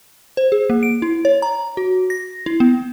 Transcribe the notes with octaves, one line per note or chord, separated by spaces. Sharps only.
C5
G#4
A#3
D7
E4
C#5
A#5
F#4
A#6
E4
B3